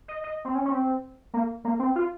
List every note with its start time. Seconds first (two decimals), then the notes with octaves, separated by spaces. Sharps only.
0.08 D#5
0.24 D#5
0.45 C4
0.55 C#4
0.65 C#4
0.71 C4
1.34 A#3
1.65 A#3
1.79 C4
1.96 F4